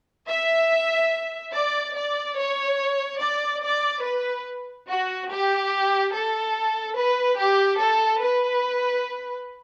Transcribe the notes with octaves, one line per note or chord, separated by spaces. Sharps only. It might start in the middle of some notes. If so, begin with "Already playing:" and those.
E5
D5
D5
C#5
D5
D5
B4
F#4
G4
A4
B4
G4
A4
B4